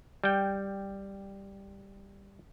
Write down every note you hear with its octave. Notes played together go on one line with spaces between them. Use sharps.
G3 G5